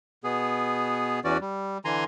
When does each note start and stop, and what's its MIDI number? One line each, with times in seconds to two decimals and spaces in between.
0.24 1.20 47
0.24 1.20 59
0.24 1.20 68
1.24 1.37 40
1.24 1.37 52
1.24 1.37 61
1.24 1.37 66
1.24 1.37 74
1.41 1.78 55
1.85 2.04 50
1.85 2.04 52
1.85 2.04 80
1.85 2.04 82
1.85 2.04 84